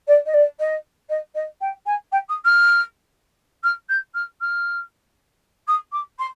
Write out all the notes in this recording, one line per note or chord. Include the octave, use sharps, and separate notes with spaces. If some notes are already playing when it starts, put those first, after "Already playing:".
D5
D#5
D5
D#5
D#5
D#5
G5
G#5
G5
D#6
F6
F6
G6
F6
F6
D#6
D6
C6